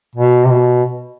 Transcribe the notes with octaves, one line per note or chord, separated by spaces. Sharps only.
B2
C3
B2